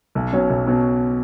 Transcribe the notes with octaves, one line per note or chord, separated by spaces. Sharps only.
B1
B2 F#3 C#4
B1
B2 F#3 C#4